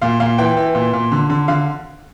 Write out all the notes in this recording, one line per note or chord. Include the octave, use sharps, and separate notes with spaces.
A#2 F5
A#2 F5
E3 G5
E3
A#2
A#2
D3
D3
D3 F5